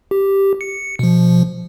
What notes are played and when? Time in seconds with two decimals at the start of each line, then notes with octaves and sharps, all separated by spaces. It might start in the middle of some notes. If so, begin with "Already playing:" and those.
0.11 G4
0.61 C#7
0.99 B2 F3